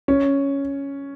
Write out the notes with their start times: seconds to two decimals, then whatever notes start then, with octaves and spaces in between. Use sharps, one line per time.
0.08 C#4